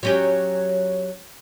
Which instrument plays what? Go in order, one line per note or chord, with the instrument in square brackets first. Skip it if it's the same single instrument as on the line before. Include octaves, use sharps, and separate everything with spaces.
[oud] F#3 C#4 G4